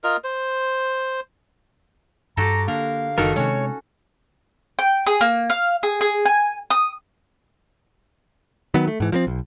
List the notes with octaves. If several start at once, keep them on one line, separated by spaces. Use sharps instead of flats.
F4 A#4 D#5
C5
G2 F#4 G4 A4 A#5
D3 A#3 A#4 F5
F#1 D#3 G3 D#4 F#4 A4 A#4
C3 G#3 C#4 F#4 C#5
G5
G#4
A#3
F5
G#4
G#4
G#5
D#6
D#3 F#3 B3
A3
G#2 E3
F3 A#3 C4
B1